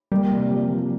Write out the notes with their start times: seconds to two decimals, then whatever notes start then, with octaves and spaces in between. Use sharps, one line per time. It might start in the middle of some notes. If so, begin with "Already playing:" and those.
0.12 G3 A#3
0.31 C3
0.51 F3
0.69 F3